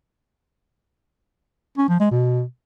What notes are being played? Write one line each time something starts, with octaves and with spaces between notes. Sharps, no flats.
C#4
F3
G#3
B2